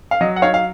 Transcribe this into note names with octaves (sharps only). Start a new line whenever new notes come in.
F5
F#3 D#5
F#5
D#4 C#5 F5
F5